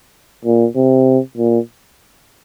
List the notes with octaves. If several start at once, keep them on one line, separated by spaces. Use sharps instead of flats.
A#2
C3
A#2